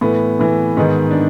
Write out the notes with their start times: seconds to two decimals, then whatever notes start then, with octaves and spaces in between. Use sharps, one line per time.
0.01 A2 E3 B3
0.39 A2 E3
0.77 G#2 D#3 B3
1.11 D4